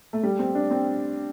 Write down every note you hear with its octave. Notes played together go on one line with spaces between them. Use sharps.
A3
G3
C4
D4
C4